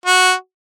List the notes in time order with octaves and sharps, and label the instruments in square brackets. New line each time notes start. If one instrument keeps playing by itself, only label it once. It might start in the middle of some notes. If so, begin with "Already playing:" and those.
[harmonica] F#4